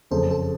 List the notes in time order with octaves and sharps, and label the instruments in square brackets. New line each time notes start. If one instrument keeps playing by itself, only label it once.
[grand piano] F#1 F2 C#3 [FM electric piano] A4 C5
[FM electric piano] A4 C5